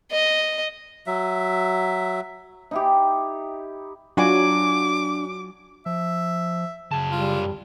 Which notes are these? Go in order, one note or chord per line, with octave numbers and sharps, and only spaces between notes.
D#5
F#3 E5
D#4 E4 G4
F#3 D4 F4 F#4 G#5 D6
F3 E5
F#2 C#3 A5
G3 F4